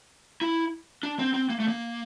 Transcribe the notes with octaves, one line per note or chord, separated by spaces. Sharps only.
E4
D4
C4
C4
A#3
A3
A#3